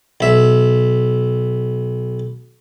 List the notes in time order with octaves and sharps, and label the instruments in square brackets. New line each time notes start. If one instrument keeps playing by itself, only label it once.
[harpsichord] B1 E5